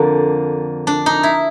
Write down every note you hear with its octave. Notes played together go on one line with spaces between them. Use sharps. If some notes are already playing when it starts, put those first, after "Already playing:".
Already playing: F2 D3 A#3
D4
D#4
E4